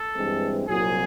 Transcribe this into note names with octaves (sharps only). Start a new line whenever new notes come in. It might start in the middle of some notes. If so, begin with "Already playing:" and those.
Already playing: A4
G2 E3 G#3 C4
C2 A#2 F#3 G#4